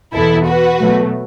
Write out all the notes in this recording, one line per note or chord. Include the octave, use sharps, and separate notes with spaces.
E2 B2 B3 E4 A4
F#4 B4
B2 F#3 A3